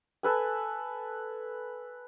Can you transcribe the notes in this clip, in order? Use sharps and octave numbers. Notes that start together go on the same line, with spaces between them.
A4 B4 G#5